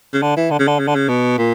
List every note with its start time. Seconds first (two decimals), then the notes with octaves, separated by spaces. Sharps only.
0.13 C#3
0.22 D3
0.37 E3
0.51 D3
0.59 C#3
0.67 D3
0.79 C#3
0.88 D3
0.95 C#3
1.08 B2
1.38 A#2